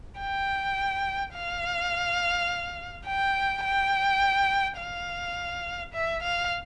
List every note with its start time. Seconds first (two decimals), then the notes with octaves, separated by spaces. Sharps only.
0.20 G5
1.35 F5
3.07 G5
3.64 G5
4.80 F5
5.94 E5
6.23 F5